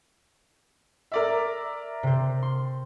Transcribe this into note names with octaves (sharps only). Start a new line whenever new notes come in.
A#4 D5 E5
C3 C5
C6